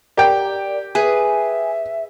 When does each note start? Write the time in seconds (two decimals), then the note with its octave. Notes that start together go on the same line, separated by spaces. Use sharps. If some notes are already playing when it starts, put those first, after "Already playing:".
0.17 G4 A#4 D5 G5
0.95 G#4 B4 E5 G#5